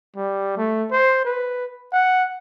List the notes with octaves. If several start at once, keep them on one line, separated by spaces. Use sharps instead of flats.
G3
A3
C5
B4
F#5